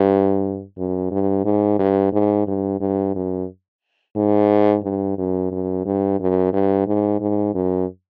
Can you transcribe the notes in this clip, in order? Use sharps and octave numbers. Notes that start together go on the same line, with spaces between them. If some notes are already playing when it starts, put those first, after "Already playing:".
Already playing: G2
F#2
G2
G#2
G2
G#2
G2
G2
F#2
G#2
G2
F#2
F#2
G2
F#2
G2
G#2
G#2
F#2